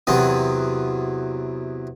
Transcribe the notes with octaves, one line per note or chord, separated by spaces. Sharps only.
E2 C3 F#3 B3 D#6